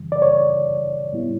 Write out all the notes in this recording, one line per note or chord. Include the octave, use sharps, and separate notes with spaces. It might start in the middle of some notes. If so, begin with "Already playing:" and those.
Already playing: F#2 C#3 E3 G3
D5
C#5
A2 G3 B3 E4